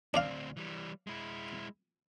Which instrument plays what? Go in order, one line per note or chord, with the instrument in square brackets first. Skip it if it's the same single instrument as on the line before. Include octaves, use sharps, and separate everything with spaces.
[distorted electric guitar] D2 C4 [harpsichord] D4 D5 F5
[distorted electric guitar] E3 G3
G#3 E4